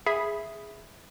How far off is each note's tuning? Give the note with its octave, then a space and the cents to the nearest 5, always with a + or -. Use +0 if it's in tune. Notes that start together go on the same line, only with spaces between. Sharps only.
G#4 +0 E5 +0 B5 +0